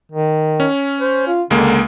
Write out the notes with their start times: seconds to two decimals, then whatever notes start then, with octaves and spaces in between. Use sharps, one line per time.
0.12 D#3
0.60 C#4
1.00 C5
1.27 F4
1.50 C#2 D3 G#3 A#3